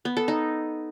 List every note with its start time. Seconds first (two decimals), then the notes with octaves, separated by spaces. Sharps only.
0.05 B3
0.17 A4
0.28 D#4